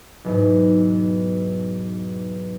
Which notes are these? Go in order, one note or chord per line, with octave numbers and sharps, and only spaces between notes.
B1 E2 G#2